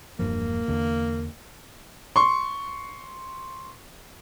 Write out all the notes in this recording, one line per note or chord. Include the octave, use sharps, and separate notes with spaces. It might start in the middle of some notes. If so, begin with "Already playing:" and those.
E1 G2 F3 A#3
E2 D3
C6 C#6